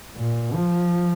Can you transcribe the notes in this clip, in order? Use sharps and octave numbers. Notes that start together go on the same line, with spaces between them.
A#2
F3